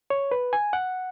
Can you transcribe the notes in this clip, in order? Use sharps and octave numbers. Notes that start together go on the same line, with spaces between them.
C#5
B4
G#5
F#5